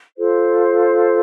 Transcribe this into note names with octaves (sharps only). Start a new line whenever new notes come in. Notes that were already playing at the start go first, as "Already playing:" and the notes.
F4 A4 C5